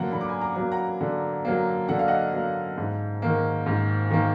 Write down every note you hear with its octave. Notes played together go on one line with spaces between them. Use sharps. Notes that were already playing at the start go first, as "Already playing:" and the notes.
Already playing: D3 F#3 A#3 F#5 A#5
D3 B5
D6
G#5 B5
A#5 D6
F#3 A#3
F#5 A#5
D3
F#3 A#3
D3 F#5
F5
D#5 F#5
F#3 A#3
G#2
D#3 A#3
G#2
D#3 A#3